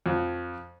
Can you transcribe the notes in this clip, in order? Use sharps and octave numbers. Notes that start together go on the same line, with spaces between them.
F2